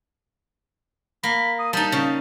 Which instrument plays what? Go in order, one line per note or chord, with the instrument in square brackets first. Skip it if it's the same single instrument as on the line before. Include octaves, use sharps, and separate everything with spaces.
[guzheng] A#3 [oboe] B5
[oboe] D#6
[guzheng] G3 D#4 [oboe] A5
[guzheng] C#3